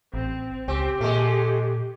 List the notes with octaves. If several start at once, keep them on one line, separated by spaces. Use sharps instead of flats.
A1 C4
C#2 C4 G4
A#2 G#3 A3